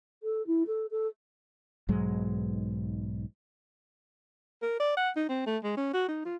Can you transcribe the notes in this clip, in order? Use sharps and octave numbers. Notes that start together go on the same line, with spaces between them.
A4
E4
A4
A4
B1 G#2 F#3 G#3
A#4
D5
F#5
D#4
C4
A3
G#3
C#4
F#4
D#4
F4